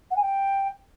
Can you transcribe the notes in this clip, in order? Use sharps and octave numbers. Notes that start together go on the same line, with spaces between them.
F#5
G#5
G5